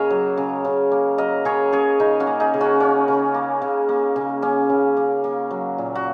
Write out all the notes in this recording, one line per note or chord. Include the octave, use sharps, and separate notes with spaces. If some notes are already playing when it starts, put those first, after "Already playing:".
Already playing: C#3 A#3 G#4 A#4 C#5 D#5
F#3
C#3
C#3
A#3
F#3 A#4 D#5
C#3 G#4 C#5
C#3 G#4 C#5
C#3 D#4
C#4 F#4
A#3
D#4 G#4
C#3
C#4 F#4
A#3 C#4
C#3
A#3
C#3
A#3
C#3
A#3 C#4
C#3
A#3
A#3
F#3
A#2
F#4